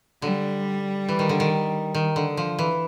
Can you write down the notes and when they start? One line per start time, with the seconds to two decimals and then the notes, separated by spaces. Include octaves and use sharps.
0.22 D3 G3
1.09 E3
1.19 D#3
1.29 D3
1.40 D#3
1.94 D#3
2.16 D3
2.37 F3
2.59 E3